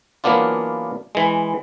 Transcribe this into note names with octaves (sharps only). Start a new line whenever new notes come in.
E3 F#3 A#3 B3 D4 F4
E3 G#3